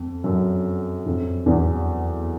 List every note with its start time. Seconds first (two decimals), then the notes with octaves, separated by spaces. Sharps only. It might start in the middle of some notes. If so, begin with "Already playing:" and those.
Already playing: F2
0.24 F#2
1.06 F2
1.46 E2